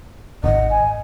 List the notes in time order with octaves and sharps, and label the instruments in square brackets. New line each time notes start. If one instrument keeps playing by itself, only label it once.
[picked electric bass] D1 G#1 [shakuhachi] D#5 [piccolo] F#5
[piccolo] G#5